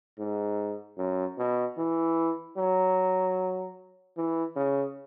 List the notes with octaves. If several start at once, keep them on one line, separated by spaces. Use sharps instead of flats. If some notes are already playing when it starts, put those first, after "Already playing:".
G#2
F#2
B2
E3
F#3
E3
C#3